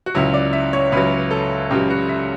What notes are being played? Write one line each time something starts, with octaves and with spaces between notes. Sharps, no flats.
F#4
C#2 C#3 F#3 E4
D5
E5
C#5
C#2 C#3 F#3 B4
A4
C#2 C#3 F#3 G4
F#4
E5